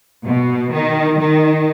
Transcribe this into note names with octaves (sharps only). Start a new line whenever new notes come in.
B2
D#3
D#3